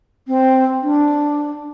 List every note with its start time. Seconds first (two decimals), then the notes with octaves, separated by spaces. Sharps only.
0.27 C4
0.82 D4